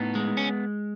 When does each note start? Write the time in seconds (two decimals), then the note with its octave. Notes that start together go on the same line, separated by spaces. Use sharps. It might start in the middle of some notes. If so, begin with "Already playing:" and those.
Already playing: A2 B3 D#4
0.15 G#3
0.37 C#4